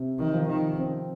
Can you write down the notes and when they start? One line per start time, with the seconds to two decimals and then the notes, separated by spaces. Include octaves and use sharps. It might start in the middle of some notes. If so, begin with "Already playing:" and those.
Already playing: C3
0.19 D#3
0.33 F3
0.48 D#3
0.79 C4